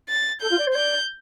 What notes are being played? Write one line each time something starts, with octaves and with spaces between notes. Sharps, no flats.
A6
A4 G6
F4
D5
C5
D5 G6